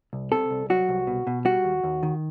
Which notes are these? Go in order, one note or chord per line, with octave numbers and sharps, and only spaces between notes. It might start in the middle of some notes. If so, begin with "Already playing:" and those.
C2
C3 A4
C2
F#3 F#4
C2
B2
B2
G3 F#4
D#2
D#2
D#3